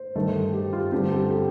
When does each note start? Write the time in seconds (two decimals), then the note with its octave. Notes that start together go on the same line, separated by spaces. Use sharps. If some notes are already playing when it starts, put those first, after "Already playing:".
Already playing: C5
0.16 G2 D#3 A3
0.54 G4
0.73 F4
0.92 G2 D3 A3 C4 G4
1.11 A4
1.30 G4